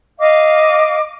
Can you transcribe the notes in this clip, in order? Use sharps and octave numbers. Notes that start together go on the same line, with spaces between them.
D#5 F5 D6